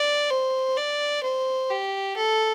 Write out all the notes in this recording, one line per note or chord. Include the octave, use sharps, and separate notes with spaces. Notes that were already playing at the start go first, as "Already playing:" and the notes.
Already playing: D5
C5
D5
C5
G4
A4